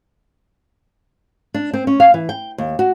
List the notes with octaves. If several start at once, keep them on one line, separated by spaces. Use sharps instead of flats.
D4
C4
C#4
F5
E3
G5
D#2
F#4